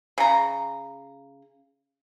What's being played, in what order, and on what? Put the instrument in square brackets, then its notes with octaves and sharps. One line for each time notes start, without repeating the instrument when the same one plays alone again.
[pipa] C#3 A#5